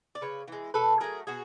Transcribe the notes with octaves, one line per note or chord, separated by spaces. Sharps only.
D5
C#3 B4 C#5
E3 G#3
B2 A4 B4
F#3 A3 G#4 A#4
B2 F#4 G#4